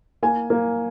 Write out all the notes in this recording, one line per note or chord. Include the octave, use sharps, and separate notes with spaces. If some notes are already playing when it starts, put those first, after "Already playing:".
A#3 G#5
A#3